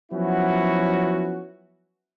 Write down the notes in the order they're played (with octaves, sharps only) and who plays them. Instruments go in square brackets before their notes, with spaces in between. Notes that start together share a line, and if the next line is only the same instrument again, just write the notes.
[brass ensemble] F3 F#3 B3 C#4 E4 F#4